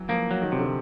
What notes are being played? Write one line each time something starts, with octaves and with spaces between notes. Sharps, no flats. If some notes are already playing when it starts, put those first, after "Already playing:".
Already playing: E3 F#3
F3 A#3
F#3
D#3
C3
D3